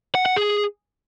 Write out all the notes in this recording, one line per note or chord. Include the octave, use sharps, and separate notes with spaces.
F#5
F#5
G#4